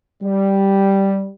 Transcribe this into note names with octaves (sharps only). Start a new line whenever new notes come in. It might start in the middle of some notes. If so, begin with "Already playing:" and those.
G3